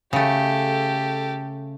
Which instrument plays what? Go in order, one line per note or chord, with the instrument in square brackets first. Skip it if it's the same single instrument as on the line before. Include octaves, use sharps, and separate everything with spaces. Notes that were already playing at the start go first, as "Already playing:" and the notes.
[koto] C#3 A3 [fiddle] G4 A4